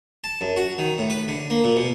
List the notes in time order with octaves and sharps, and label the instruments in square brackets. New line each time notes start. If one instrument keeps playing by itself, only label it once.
[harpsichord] A5
F#2
F#4
D#3
A2
B4
D3
A#3
A#2
B2